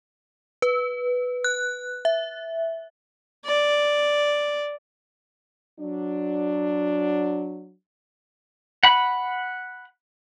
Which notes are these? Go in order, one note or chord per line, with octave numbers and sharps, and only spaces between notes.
B4
F#6
E5
D5
F#3 D4
F#5 B5